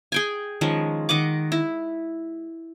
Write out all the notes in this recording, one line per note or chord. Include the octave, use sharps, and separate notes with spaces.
G#4 G5 G#5
D#3 F3 G#3 C#4
D#3 D#5 F#5 D6
E4